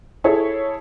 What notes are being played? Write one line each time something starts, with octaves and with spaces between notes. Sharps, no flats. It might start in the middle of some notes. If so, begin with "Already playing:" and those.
E4 G#4 A4 C#5